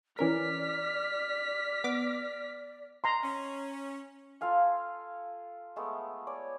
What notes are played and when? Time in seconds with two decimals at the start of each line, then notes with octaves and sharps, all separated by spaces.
0.19 E3 C#4 A#4 D5 F6 B6
1.84 B3 D6
3.04 A#5 C6
3.24 C#4
4.41 F4 A4 F5 G#5
5.76 G#3 A3 B3
6.27 C#5 D5 G#5